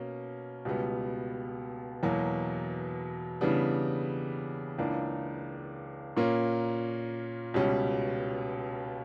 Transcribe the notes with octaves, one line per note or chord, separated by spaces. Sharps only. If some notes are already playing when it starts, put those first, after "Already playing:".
Already playing: B2 A#3 C#4
C#2 B2 G3 B3
E2 B2 F#3 A#3
C#3 E3 G3 B3 D4
C#2 C#3 E3 A#3 D4
A#2 A#3 C#4
C#2 B2 G3 C#4